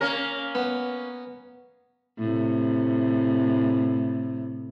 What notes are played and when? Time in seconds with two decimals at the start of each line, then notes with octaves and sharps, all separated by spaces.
0.01 A#3 C#4 A#4
0.55 B3
2.19 A2 C3